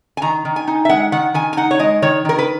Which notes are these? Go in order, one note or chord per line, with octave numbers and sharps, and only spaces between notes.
G#5
D#3 A#5
D#3
G#5
D#4
E5
G#3 F#5
D#3 F#5
D#3 G#5
G#5
D#4 F#5
C#5
G#3 D#5
D#3 C#5
D#3 A#4
B4